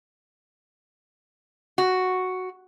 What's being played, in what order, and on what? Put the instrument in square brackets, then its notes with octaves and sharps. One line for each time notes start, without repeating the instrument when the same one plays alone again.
[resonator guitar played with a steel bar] F#4